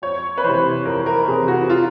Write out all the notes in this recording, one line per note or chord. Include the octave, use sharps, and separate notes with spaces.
F2 C#5
B4
C3 E3 C5
F2 A#4
A#4
C3 E3 G#4
F#4
F4